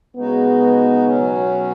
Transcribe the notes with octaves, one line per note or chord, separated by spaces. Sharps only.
C#3 G#3 B3 D#4 F#4
B2 F#3 C#4